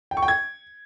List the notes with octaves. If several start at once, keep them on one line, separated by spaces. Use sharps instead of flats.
G5
C#6
G5
G#6